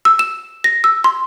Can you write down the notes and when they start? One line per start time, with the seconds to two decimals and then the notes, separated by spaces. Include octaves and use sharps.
0.05 E6
0.19 E7
0.64 A#6
0.84 E6
1.04 C6